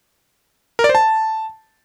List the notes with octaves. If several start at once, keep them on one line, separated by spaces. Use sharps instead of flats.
A#4
D5
C5
A5